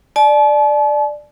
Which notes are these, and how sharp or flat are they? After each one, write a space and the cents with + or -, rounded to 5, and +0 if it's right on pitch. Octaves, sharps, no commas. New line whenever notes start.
D5 +10 A5 -40